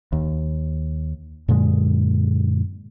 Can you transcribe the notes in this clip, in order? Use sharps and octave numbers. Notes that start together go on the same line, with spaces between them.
D#2
F#2 A#2 D3 G#3